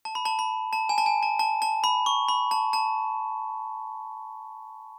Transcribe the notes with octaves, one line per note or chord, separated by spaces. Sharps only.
A5
B5
A5
B5
A5
G#5
A5
G#5
A5
A5
A5
B5
C#6
B5
A5
A5